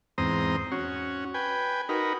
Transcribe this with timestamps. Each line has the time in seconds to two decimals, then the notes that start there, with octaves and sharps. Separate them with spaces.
0.18 E2 G#2 C4 C5 A#5 D#6
0.72 C#4 F#4
1.34 B4 G5 G#5
1.89 D#4 F#4 A#4 B4